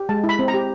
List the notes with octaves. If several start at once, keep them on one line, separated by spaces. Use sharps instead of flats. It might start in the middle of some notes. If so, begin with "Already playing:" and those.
Already playing: G4
G#3 A5
E4
B5
C4
A#5
G4